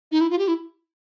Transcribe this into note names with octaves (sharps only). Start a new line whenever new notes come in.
D#4
E4
F4
G4
E4